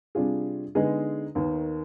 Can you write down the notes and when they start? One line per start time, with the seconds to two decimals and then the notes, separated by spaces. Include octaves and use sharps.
0.15 C3 G3 D4 F4 G#4
0.75 D3 G#3 B3 D#4 G#4
1.35 D#2 D#3 B3